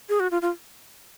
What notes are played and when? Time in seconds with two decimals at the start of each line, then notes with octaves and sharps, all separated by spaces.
0.09 G#4
0.20 F#4
0.31 F4
0.42 F4